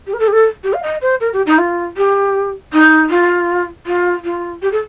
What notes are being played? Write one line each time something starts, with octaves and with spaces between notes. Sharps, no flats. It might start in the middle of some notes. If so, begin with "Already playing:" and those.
G4
A#4
A4
G4
A4
G4
F5
D#5
C5
A#4
G4
D#4
F4
G4
D#4
F4
F4
F4
G4
A4